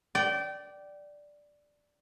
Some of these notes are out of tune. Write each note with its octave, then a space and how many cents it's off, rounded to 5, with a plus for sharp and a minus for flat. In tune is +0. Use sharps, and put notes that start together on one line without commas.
D5 +0 G5 -25